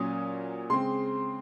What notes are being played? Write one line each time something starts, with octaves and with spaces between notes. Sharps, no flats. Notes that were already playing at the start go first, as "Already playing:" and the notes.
Already playing: A#2 F#3 C#4 D#6
C#3 G#3 C4 C6